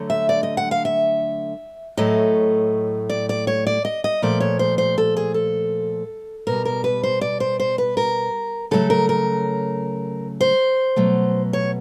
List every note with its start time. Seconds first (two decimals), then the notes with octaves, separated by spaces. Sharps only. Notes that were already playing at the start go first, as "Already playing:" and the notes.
Already playing: D3 F#3 A3
0.10 E5
0.29 D5
0.43 D#5
0.57 F#5
0.71 F5
0.85 E5
1.97 A2 F#3 A3 D#5
3.10 D5
3.29 D5
3.47 C#5
3.67 D5
3.85 D#5
4.04 D#5
4.22 A#2 F3 A3 D5
4.40 C#5
4.59 C5
4.78 C5
4.98 A4
5.17 G#4
5.34 A4
6.47 B2 G3 A#4
6.65 A#4
6.84 B4
7.03 C5
7.21 D5
7.40 C5
7.59 C5
7.78 B4
7.97 A#4
8.71 C#3 F#3 A3 A4
8.90 A#4
9.09 A#4
10.41 C5
10.96 B2 F#3 A3
11.53 C#5